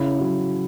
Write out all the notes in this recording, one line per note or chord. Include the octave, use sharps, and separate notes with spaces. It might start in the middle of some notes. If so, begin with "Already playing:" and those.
Already playing: C#3 E4
F#3